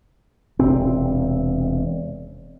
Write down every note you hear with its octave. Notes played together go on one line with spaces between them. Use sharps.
E1 C3 C4